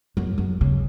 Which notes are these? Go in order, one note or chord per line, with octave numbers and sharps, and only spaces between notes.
F#2
F#2
C#3